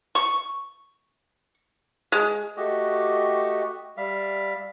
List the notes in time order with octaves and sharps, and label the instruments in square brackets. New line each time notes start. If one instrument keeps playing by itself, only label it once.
[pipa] C#6
G#3
[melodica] A3 F#4 G4 D#5
G3 E5 F5